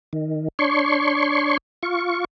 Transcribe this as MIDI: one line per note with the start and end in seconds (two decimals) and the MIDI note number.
0.13 0.48 51
0.59 1.57 62
0.59 1.57 73
0.59 1.57 84
0.59 1.57 85
1.83 2.25 65
1.83 2.25 85